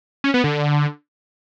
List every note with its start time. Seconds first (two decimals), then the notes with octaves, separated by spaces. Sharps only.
0.24 C#4
0.34 B3
0.44 D3